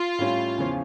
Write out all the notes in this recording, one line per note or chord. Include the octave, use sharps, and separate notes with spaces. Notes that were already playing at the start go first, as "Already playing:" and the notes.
Already playing: F4
A2 G3 C#4
E2 C#3 F3 C#4